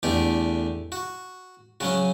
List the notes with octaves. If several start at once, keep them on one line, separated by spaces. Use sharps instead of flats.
E2 D3 A3 G4
F#4
C#3 F#3 C#4 F#4